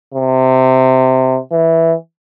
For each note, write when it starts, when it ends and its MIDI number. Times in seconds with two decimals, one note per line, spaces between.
0.14 1.39 48
1.52 1.93 52